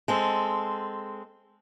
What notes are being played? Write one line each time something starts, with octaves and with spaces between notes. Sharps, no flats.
G#3 C4 A4